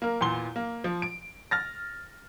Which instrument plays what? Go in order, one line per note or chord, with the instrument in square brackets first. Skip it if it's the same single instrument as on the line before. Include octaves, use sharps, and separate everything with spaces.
[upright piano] A#3 A#4
E2 A#2 E3 C6 G7
A#3
F3
D7
F6 A6 A#6